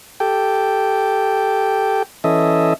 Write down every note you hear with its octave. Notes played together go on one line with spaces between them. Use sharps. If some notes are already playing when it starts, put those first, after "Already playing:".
G4 A4 G5
E3 C#4 A4 D#5 E5